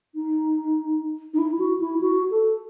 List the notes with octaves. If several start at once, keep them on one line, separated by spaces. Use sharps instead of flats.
D#4
D#4
E4
F#4
E4
F#4
A4